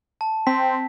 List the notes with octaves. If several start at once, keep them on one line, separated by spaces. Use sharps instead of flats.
A5
C4 B6